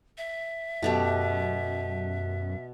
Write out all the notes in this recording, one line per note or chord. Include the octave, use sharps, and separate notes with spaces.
E5
F#2 B2 A3 G4